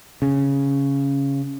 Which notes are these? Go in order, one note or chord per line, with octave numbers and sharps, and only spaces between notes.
C#3